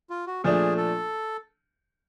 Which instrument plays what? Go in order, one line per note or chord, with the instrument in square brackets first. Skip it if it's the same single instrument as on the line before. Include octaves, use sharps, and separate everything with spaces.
[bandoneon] F4
F#4
[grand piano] A#2 F3 A3 D4 [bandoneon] G#4
[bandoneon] A4